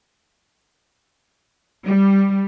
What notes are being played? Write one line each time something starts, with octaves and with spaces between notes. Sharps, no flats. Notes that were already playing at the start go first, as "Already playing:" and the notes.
G3